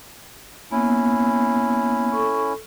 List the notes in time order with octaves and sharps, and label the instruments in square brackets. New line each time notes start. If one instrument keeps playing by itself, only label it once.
[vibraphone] A#3 B3 [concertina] C#4 E4
[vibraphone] A4 C#6